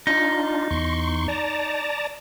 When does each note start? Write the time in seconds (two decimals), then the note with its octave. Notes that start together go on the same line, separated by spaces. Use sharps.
0.07 D4 D#4 F4
0.71 E2 C6 C#6
1.28 D5 A5 A#5